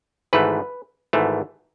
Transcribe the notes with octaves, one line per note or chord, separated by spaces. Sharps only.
G#1 G#2 E3 A3 B4
G#1 G#2 E3 A3